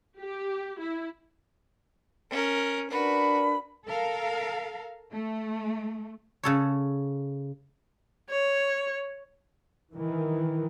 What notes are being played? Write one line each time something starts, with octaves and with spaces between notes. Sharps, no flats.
G4
E4
C#4 A#4
D4 F#4 A#4 B4 B5
A4 A#4 F5
A3
C#3 A4 C#5
C#5
D#3 E3